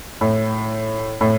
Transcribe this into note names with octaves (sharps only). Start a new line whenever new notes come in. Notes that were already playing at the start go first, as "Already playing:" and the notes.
A2
A2